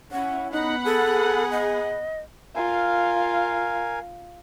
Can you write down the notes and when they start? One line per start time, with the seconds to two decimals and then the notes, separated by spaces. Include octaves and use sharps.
0.12 C#4 E4 F#5
0.52 B3 D#4 F#5 B5
0.85 G#4 A4
1.51 D#5
2.56 F4 A#4 F5 G#5